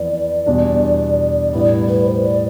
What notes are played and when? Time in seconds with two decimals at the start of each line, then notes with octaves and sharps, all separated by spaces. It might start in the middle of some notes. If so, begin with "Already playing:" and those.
Already playing: F2 E3 B3 D5
0.47 E2 B2 G3 D4
1.53 A2 G3 B3 E4 D5
1.88 B4
2.06 C5
2.24 D5